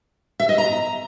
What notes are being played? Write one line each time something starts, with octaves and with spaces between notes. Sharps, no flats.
E5
D#5
A#5